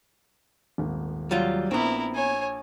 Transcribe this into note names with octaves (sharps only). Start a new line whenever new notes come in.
D#1 G#1
F#3 G3 F4
A#1 B3 C4 E4 A#4 C#6
C#5 G#5